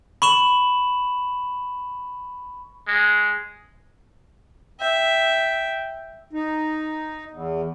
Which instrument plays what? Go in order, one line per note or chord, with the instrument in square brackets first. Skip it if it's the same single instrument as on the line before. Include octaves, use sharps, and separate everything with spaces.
[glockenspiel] B5 C#6 E7 F#7
[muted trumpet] G#3
[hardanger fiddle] E5 [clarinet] G5
[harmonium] D#4
E2